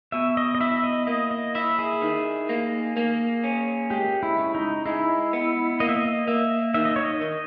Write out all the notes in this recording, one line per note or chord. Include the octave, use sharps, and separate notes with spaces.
B2 E5
D#5
D#5
E4 E5
D#5
A#3 D#5
D#5
E4 E5
G#4
D#3
A#3
A#3
C#4
G#3 G4
E4
C#3
D#4
G#3 E4
B3
A#3 D#5
E5
D#5
A#3 E5
D#3 E5
D#5
C#5
D#5
D#3